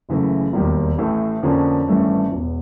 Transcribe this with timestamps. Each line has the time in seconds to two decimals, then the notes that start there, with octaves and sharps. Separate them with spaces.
0.09 F#1 F#2 C#3 E3 A3
0.53 E1 D#2 D#3 G3
0.98 A1 A2 E3 A3
1.43 F2 D3 F3 A#3 C#4
1.87 G#1 G2 E3 A3 C#4
2.31 E1 E2 B2